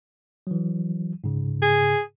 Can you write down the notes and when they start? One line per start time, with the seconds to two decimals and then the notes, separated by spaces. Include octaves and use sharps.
0.47 E3 F#3
1.24 G#2 C#3
1.62 G#4